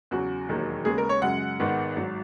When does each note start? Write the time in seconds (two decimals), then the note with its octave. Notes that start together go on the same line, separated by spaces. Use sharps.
0.11 E2 C#3 F#3 F#4
0.49 E1 D#2 D#3 F#3
0.85 D#2 C#3 G#3 B3 G#4
0.98 A#4
1.09 C#5
1.22 F#2 C#3 G#3 F#5
1.59 G#1 G#2 D#3 G#3 B3
1.96 G#1 G#2 F#3